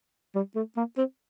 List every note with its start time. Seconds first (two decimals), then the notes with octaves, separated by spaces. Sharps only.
0.35 G3
0.56 A3
0.77 A#3
0.97 C4